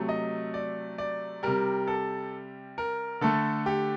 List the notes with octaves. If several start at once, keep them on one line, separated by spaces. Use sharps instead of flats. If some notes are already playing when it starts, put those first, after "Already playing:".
Already playing: C3 F#3 A3
D#5
D5
D5
C3 G3 A#4
A4
A#4
D3 A3 A4
G4